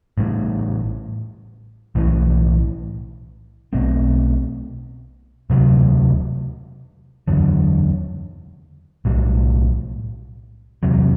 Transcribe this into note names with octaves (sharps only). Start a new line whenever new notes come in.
A1 A2 G3
B1 A2 E3
B1 B2 A3 C4
E1 D2 C3 F#3
F#1 E2 D3 F#3
B1 A2 G3
E1 E2 C3 F#3